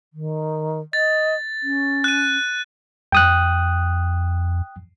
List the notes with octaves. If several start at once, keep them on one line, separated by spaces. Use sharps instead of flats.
D#3
D#5 A6
C#4
F#6 D#7
F2 G5 D#6 F#6